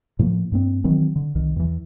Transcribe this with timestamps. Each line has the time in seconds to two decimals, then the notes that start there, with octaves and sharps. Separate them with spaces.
0.19 A2 F3 A#3
0.52 G2 A#3 C4
0.84 D#3 E3 F#3 C4
1.16 D3
1.35 C2 D#3
1.56 E2 E3